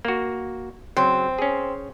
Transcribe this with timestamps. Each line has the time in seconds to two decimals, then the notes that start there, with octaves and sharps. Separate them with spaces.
0.05 A#3 F#4
0.97 C#3 F#3 C4
1.39 C#4 G#4